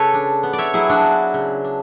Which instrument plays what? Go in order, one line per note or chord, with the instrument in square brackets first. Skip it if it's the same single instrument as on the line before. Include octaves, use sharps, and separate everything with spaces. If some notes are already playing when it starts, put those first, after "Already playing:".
Already playing: [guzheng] C#3 A4 B4 C#5
D4
B3
D5
C#5 E5
F#3 E4 G#4
D4 F#4
B3
C#3
D4